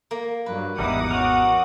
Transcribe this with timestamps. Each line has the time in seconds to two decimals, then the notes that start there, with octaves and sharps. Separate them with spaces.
0.11 A#3
0.46 G2 F#3 B4
0.79 G#1 E2 G3 D#4 E4 F#5 D6 D#6
1.11 C#4 F#4 A#4